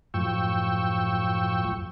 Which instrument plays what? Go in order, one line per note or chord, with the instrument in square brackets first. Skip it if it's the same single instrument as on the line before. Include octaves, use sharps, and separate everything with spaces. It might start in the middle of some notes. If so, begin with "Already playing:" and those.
[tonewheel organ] F#2 A2 F3 G5 C#6 E6